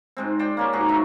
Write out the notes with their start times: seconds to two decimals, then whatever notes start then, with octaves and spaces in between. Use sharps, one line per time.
0.17 G#2 G#3 C4
0.39 C5 D5 G5
0.57 A#3 C#4 G4
0.73 G#2 F#4 G#4 A#5
0.89 F#3 D#4 C#5 E5